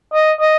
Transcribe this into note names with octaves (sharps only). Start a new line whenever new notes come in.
D#5
D#5